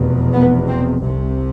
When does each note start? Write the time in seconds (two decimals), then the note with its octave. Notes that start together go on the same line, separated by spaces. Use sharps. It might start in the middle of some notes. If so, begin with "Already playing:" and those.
Already playing: F1 E2 B2
0.33 B3
0.68 C4
1.01 C2 C3